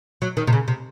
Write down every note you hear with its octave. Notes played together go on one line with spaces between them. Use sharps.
F#3
D#3
C3
C#3
C3